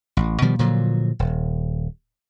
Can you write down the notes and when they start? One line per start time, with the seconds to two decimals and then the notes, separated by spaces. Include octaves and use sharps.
0.17 A1
0.42 B2 D#3 F3 G3
0.59 A#2 D3 F3 F#3
1.19 D#1